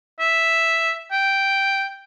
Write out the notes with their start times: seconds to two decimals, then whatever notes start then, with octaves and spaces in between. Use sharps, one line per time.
0.20 E5
1.12 G5